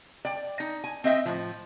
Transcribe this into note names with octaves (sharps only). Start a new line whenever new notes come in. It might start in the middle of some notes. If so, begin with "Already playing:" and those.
D5 G5
D#4
G#5
C4 D#5 E5 G5
A2 F3